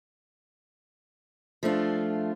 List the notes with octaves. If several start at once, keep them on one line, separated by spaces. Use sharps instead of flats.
F3 A3 D4 F4